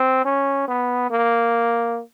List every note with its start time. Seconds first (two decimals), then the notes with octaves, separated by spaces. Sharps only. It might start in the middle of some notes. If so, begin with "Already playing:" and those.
Already playing: C4
0.25 C#4
0.68 B3
1.11 A#3